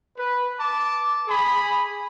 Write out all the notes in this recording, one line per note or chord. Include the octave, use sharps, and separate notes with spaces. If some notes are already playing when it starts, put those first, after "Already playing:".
B4
A5 D6
G#4 B5